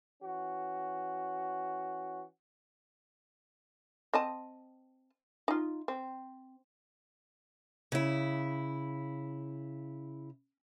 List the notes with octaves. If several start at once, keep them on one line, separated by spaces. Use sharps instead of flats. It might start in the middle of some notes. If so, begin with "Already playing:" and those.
E3 C#4 F#4
C4 D#5 A5
D#4 F4
C4
C#3 E4